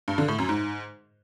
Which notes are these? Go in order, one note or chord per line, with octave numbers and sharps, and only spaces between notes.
G2
D3
A2
F#2
G#2